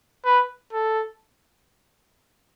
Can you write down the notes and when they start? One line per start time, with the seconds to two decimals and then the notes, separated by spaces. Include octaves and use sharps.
0.25 B4
0.73 A4